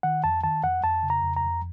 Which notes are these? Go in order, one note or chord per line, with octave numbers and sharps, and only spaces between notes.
D#3 F#5
F2 A5
D#3 A5
F2 F#5
F2 A5
C#3
A#5
F2
A#5
F2